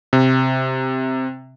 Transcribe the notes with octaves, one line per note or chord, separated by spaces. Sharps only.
C3